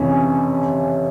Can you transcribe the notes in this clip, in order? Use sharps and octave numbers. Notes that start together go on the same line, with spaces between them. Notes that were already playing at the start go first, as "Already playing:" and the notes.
Already playing: F2 C3 E3 C#4